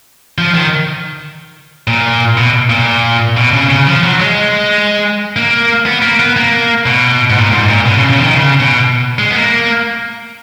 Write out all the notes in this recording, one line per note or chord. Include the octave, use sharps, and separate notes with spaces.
F3
D#3
A#2
B2
A#2
B2
C#3
C#3
F3
F#3
G#3
A#3
B3
A#3
B3
A#3
B2
G#2
A#2
G#2
A#2
B2
C#3
C#3
F3
D#3
C#3
B2
G#3
B3
A#3